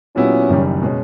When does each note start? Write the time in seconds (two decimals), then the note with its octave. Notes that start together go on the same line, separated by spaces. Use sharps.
0.16 A#2 F#3 B3 C#4 E4 G4
0.49 F#1 F#2 D#3 G3
0.82 B2 G#3 C#4